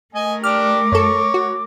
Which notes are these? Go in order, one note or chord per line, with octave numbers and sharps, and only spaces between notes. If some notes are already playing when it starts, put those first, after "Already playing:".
A3 A#4 D#5 G#5
D4 G4 D5 D6 F6
F#2 A4 C#5
F#4